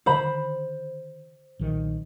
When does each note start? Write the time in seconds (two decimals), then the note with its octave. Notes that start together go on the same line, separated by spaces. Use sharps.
0.06 D3 D#3 C5 B5
1.59 B1 A#2 D#3